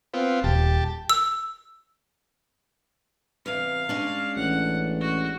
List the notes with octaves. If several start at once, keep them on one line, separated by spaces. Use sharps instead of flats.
B3 C4 F4
D#1 G4 A5
E6
E2 C3 F5
G#3 C#4 D4
A1 F#5
F#4